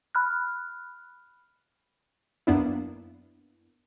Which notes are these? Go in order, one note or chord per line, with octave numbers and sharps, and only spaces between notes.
B5 F6 F#6
F#2 A#3 B3 D4 E4